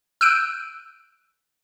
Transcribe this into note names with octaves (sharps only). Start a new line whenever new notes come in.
E6 F#6 G6 D7 D#7